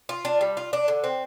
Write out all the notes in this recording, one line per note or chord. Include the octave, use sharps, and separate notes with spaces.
F4
D4
G3
F4
D4
D3
C4